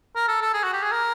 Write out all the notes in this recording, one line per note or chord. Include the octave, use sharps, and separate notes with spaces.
A#4
A4
A4
G#4
F#4
G4
G#4
A#4